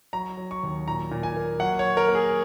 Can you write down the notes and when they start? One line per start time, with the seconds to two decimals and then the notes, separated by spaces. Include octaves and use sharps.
0.13 F#3 A#5
0.37 F#3
0.51 C#6
0.63 D#2
0.88 A#2 A#5
1.11 A#2
1.23 G#5
1.36 A#3
1.60 F#3 F#5
1.79 F#3 C#5
1.97 A#4
2.09 A#3
2.15 G#4